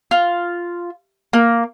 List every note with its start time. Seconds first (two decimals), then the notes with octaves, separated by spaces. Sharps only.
0.11 F4
1.33 A#3